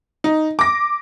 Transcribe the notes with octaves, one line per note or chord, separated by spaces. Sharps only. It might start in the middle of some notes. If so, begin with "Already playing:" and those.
D#4
D6 A#6